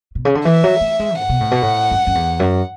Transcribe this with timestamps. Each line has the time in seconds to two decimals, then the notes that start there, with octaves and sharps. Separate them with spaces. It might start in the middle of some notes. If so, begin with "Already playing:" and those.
0.15 B2
0.25 C#3
0.35 D3
0.45 E3 E5
0.64 F#3
0.81 A3
1.00 G#3
1.18 A2 F#5
1.29 B2
1.40 A2
1.51 B2
1.62 A2
1.91 F#2
2.07 F#2
2.15 E2
2.40 F#2